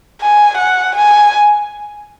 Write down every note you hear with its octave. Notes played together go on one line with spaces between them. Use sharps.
G#5
F#5
G#5